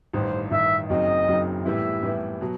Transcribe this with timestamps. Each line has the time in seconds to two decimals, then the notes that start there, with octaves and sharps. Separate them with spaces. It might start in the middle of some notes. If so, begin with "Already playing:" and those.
0.13 A1 G2 D#3 C5
0.51 A1 G2 D#3 E5
0.89 F#1 F#2 F#3 C4 D#4 D#5
1.27 F#1 F#2 F#3 C4 D#4
1.65 A2 E3 G3 B3 E4 E5
2.03 A2 E3 G3 B3 E4
2.41 B2 F#3